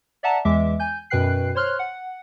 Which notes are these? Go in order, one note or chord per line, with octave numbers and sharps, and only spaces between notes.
D5 E5 F#5 A5 A#5
E2 E3 G#3 E5 D6
G#5 G6
F#2 B2 B4 G5 F#6 C7
C5 C#5 C6 F6 F#6
F#5